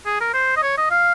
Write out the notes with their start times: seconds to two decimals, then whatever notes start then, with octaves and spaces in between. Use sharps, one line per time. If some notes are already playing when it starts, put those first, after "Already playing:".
0.06 G#4
0.21 A#4
0.34 C5
0.57 D#5
0.63 C#5
0.78 D#5
0.91 F5